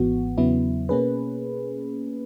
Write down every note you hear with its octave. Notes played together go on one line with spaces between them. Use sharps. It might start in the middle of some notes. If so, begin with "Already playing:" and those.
Already playing: G#1 G#2 E3 B3 F#4
E2 C#3 F#3 B3 E4
B2 A#3 C#4 G#4 B4